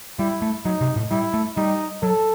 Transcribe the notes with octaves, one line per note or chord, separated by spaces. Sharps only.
G3 E4
A3
F#3 D#4
C3
A2
G3 E4
A3
G3 D#4
F#3 A4